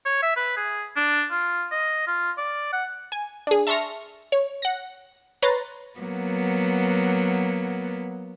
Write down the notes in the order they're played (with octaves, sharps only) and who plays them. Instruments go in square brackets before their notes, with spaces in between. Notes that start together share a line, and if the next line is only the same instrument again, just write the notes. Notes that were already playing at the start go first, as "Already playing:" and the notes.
[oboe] C#5
E5
B4
G#4
D4
F4
D#5
F4
D5
F#5
[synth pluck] G#5
D4 G#4
E5 A5 C6 C#6 F6 A#6
C#5
F#5 A#6
B4 C#5 A#5 C6 A6
[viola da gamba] F#3 A#3 B3